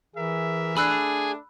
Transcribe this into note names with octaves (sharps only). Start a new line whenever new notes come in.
E3 G#4 A#4 E5
A3 D4 G#4 B5 E6 F#6